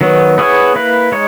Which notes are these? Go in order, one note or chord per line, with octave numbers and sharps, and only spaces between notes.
D#3 F#3 B3
B3 E4 G#4 C#5
A#3 E4 B4
G#3 D#4 C#5